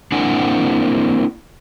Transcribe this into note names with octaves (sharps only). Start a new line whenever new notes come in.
A#3 C4 D4 E4 F#5 G#5